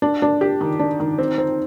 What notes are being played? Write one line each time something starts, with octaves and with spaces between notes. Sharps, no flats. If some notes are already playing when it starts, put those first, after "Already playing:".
D4
D4
G4
D#3
D4
D#3
C4
C4